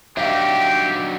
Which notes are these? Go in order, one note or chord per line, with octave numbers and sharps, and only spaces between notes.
F#3 D4 D#4 G4 E5 F5